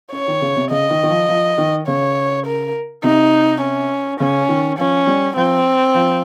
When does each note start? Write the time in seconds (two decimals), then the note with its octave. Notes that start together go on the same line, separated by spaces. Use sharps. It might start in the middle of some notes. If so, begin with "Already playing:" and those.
0.12 C#4 C#5
0.28 D#3
0.42 C#3
0.56 C3
0.71 C#3 D#5
0.90 D#3
1.03 D#3
1.09 F3
1.29 F3
1.58 D#3
1.87 C#3 C#5
2.46 A#4
3.04 C3 D#4
3.61 C#4
4.20 C#3 C#4
4.49 D#3
4.78 F3 C#4
5.07 G3
5.36 F3 C4
5.94 F3